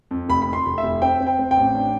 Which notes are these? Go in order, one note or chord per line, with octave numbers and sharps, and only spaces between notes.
F2
F1 B5
B5
F2
C6
F1
E5
F1
C4 G5
C4
G5
C4
G5
A1
D4